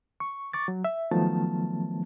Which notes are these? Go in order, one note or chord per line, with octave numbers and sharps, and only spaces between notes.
C#6
C#6 D6 A6
F#3
E5
D#3 F3 F#3 A3 B3 A5